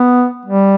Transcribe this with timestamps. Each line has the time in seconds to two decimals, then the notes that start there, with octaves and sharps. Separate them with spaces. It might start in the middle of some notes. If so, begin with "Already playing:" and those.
Already playing: B3
0.46 G3